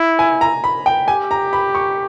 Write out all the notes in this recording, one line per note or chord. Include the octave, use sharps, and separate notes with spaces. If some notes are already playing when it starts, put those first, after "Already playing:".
Already playing: E4
G#5
A#5
B5
G5
G4 G#5
A#5
B5
C#6